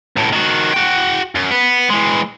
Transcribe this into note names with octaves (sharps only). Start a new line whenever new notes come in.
C#2 A2
D#3 F#4
F#4 G5
F#2
B3
E3 G#3